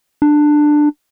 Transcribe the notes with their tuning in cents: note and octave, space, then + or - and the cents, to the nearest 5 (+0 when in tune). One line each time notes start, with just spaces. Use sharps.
D4 +15